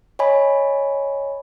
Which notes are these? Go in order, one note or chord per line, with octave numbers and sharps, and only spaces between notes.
C#5 D#5 G#5 B5